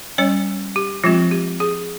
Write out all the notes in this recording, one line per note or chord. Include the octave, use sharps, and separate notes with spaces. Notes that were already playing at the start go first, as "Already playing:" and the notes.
G3 C#4 C#5
G4
F3 G#3 C4 F4
G4
G#4